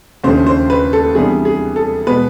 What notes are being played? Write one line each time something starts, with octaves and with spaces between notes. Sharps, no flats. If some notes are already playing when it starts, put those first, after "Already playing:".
D#2 C#3 F3 A3 D4 C5
C5
B4
A4
C3 E3 G3 B3 D4 G#4
G#4
A4
B2 G#3 B3 B4